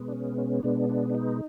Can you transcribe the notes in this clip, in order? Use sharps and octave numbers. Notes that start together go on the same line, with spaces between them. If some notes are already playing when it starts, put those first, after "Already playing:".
Already playing: B2 G#3 B3
D4
C#4
C#4
B2 G#3 B3 D4
D4
D4
D#4